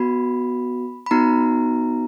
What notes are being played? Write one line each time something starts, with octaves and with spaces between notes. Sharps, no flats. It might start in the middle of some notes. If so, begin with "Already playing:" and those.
Already playing: B3 F#4 B5
B5
B3 D#4 F#4 A#5